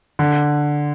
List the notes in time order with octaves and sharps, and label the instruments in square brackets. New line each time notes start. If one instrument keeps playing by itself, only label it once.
[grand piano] D3